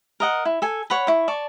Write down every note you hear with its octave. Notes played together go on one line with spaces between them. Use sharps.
A#4 D#5 F#5
E4
A4 G#5
C#5 F#5 B5
E4 C#6
D5 A5 C#6